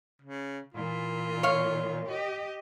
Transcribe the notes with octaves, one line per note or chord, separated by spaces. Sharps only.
C#3
A#2 E3 F4
C#5 F5
G4 D#5